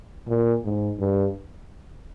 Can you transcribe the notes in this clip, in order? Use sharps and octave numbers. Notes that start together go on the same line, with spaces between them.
A#2
G#2
G2